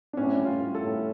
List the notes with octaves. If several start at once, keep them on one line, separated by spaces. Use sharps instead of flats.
D4
A2 C#4
G3
F4
A2
A4
A2